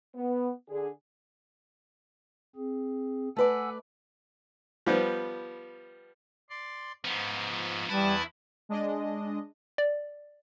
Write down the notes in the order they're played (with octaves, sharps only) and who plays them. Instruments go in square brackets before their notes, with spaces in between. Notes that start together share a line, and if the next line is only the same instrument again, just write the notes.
[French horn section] B3
D3 G#4
[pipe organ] C4 G#4
[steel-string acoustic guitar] A3 B4 D5 [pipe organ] F#5 G#5 E6
[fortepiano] F3 G3 B3
[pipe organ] D5 C6
[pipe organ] G#2 [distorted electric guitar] F3 B3
[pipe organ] E2 B4 A5 [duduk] G3 [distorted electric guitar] E4
[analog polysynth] G#3 D4 D#5
[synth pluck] D5